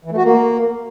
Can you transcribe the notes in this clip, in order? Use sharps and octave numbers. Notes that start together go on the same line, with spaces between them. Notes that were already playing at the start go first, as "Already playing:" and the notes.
E3
A3
F#4
A#3